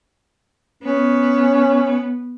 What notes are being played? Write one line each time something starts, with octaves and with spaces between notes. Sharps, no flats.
B3 C#4